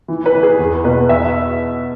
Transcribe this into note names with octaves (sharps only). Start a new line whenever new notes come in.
E3
B4
E3
G#4
E2
B2 B4
E2 E5